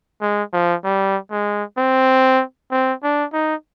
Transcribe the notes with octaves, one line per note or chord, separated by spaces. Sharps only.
G#3
F3
G3
G#3
C4
C4
D4
D#4